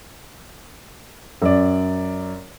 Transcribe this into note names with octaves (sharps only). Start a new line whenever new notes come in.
F#2 D5